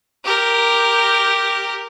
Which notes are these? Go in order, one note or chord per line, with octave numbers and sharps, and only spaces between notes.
G4 A#4